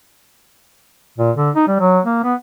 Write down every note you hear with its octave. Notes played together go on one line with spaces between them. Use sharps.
A#2
D3
D#4
G3
F#3
A#3
B3